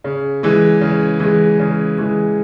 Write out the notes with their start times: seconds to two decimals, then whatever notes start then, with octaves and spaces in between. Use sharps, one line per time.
0.04 C#3
0.43 E3 G#3
0.81 C#3
1.20 E3 G#3
1.60 C#3
1.98 E3 G#3